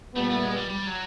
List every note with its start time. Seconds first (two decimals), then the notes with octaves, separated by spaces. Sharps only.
0.15 A#2 G3 A3 B3
0.30 A3
0.43 G#3
0.56 G3
0.69 G3
0.87 F#3